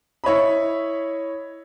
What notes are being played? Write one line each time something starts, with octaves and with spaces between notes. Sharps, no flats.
E4 C#5 D#5 B5